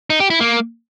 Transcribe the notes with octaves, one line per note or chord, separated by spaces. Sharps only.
D#4
G4
E4
A#3